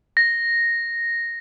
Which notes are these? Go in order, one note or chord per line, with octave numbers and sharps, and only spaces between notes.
A#6